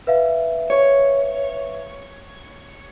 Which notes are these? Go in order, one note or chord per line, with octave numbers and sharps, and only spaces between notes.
B4 E5 F5
C#5